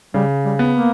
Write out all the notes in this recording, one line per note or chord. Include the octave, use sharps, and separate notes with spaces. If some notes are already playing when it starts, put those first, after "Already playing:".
C#3 G3
G3
B3
A#3